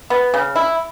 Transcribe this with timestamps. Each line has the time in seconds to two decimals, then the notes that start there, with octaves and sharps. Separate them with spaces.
0.10 B3
0.34 C#3
0.56 E4